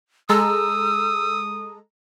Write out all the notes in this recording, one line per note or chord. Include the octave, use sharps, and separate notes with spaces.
G#3 A4 A#5 D#6 E6